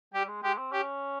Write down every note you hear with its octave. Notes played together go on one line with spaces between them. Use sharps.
G3 G4
G#3
G#3 G4
C4
C#4 G4